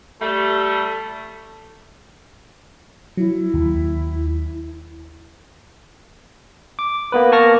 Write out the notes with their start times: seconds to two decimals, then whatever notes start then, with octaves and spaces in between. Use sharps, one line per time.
0.21 G3 A3
3.17 F#3 E4
3.54 D#2
6.79 D6
7.12 A#3 B3 B4
7.32 A#3 A5 C#6 F6 A#6